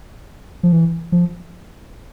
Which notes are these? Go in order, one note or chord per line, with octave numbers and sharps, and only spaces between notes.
F3
E3
F3